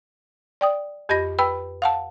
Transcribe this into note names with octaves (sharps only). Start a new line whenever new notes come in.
D5 G5 D#6
F2 G4 D#5 B5 A#6
B4 G5 B5 E6
F5 F#5 A5